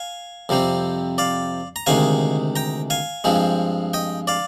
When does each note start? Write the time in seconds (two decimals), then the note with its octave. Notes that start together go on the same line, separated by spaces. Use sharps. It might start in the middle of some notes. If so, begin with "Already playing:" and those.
Already playing: F5 G#5
0.49 F2 C3 G3 C4
1.18 D5 F5
1.76 A#5
1.86 D2 C3 D#3 G#3 F5 G#5
2.56 G5 A#5
2.90 F5 G#5
3.24 G2 F3 G#3 C4
3.93 D#5 G5
4.27 D5 F5